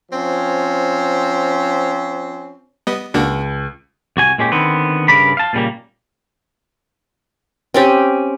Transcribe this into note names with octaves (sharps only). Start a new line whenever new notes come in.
F3 C4 C#4
G3 B3 D#5
C#2 A#3 D4 F#4
C2 F#4 G#5
A#2 G#3 C#4 G4
D3 D#3 B3 C4
G2 C#3 A#4 D5 B5
F5 A5
A#2 C#3 G3 A#3
C4 C#4 G4